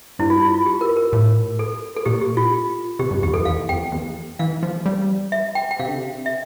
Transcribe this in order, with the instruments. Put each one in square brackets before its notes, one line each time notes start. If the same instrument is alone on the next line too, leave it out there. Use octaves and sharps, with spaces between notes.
[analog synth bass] G2 [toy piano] E4
[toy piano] F4
F4
F4
G4
A#4
A#4
[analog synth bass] A2
[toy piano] A4
A4
[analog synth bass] A#2 [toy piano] G4
[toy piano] G4
F4
[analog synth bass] C3 [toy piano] G4
[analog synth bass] G2
[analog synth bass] E2 [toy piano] G4
[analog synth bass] F2 [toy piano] A4
[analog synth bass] E2 [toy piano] F5
[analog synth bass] F2 [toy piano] G5
[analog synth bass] E2
[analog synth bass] E3 [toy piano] F5
[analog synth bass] F3
G3
[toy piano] E5
G5
G5
[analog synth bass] C3 [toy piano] F5
[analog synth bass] D3
C3
[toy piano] E5